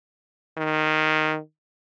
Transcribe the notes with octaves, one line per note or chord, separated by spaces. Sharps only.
D#3